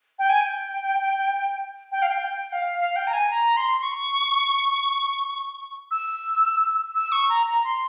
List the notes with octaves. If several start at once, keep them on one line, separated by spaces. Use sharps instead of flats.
G5
G#5
G5
G5
F5
G5
G5
F5
F5
G5
A#5
G#5
A#5
C6
C6
C#6
E6
E6
C#6
A#5
A#5
C6